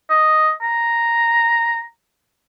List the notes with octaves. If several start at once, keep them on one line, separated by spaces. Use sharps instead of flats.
D#5
A#5